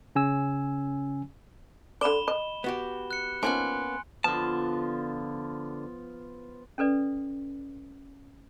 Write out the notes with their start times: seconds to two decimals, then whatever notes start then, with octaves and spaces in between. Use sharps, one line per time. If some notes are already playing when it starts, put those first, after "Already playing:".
0.15 C#3 C#4 G#5 E6
2.01 D3 D5 B5 E7 G7
2.28 D#5
2.64 B3 F#4 G4
3.11 F#6 C#7
3.43 F3 A#3 B3 C#4 D#4 G#5 C6 F#6
4.24 D3 F3 B3 F4 A5
6.78 C#4 A4 B4 D5